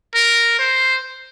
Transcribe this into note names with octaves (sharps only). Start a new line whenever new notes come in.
A#4
C5